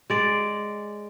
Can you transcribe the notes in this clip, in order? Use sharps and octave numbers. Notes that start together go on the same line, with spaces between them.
G#3 D5